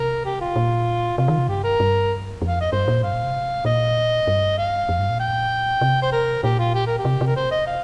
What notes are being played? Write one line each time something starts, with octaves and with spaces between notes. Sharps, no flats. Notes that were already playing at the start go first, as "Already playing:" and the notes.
Already playing: C3 A#4
G4
F4
A#2
C3 F4
D#3
C3
G2 G4
A#4
G2
F2
F5
D#5
G2 C5
A#2
G2 F5
A#2
C3
A#2 D#5
G2
F5
F2
G2
A#2
G5
C3
C5
A#4
A#2 G4
F4
G4
A#4
G4
C3
C3
A#4
C5
D#5
F5